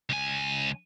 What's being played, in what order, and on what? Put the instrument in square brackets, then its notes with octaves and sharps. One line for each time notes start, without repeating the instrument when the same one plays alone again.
[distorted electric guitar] C#2 G#5